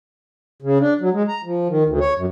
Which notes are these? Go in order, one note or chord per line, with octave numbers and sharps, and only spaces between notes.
C#3
D4
F#3
G#3
A#5
F3
D#3
D2
C#5
F#2